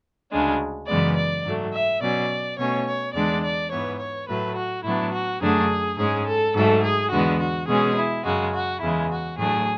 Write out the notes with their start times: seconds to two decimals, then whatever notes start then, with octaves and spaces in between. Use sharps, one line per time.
0.32 D2 C#3 G#3 D4
0.88 F#2 C#3 E3 G#3 B3 D5
1.16 D5
1.45 G#2 F#3 A3
1.74 E5
2.01 B2 F#3 C#4 D5
2.59 B2 A3 C#4 C#5
2.87 C#5
3.15 E2 D3 G#3 D4 D5
3.43 D5
3.71 G#2 E3 B3 C#5
3.99 C#5
4.29 A2 F#3 A3 B4
4.56 F#4
4.85 A2 F#3 B3 D4 E4
5.13 F#4
5.41 F#2 D3 F#3 A3 D4 G#4
5.98 G#2 G#3 C#4 G#4
6.27 A4
6.55 G#2 F#3 A3 A4
6.83 G#4
7.11 E2 D3 G#3 B3 F#4
7.40 F#4
7.68 B2 G#3 C#4 G#4
7.97 E4
8.24 F#2 C#3 G#3 F#4
8.54 F#4
8.81 E2 C#3 G#3 E4
9.10 F#4
9.38 A2 F#3 A3 D4 G#4